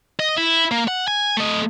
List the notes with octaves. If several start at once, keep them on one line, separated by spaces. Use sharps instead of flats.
D#5
E4
A#3
F#5
G#5
A3 D#5